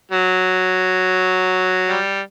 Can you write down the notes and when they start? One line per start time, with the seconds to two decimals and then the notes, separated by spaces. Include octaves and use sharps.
0.11 F#3
1.89 G3